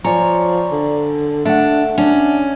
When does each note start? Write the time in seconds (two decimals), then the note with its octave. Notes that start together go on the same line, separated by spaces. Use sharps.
0.05 F3 C#5 D5 G#5 A#5
0.72 D3
1.45 A3 D4 E5 F#5
1.98 C#4 D4